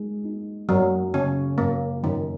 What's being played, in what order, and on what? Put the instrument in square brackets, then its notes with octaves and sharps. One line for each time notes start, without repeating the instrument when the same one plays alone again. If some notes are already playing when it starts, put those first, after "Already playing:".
Already playing: [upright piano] G#3 D#4
D#4
[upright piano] F#2 [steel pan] F#3
[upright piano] C#3 [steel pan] C#4
[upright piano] F#2 [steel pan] A#3
[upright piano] F#2 [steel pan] D#3